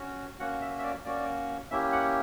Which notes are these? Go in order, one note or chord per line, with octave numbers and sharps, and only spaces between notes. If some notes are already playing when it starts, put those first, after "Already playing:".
Already playing: C#4 F#4
A#3 C#4 F#4 F#5
E5
E5
D5
A#3 C#4 F#4 D5
A#3 C#4 E4 G4 E5
F#5